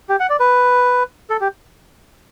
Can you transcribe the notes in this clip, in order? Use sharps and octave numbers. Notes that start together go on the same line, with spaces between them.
G4
F#5
D5
B4
A4
G4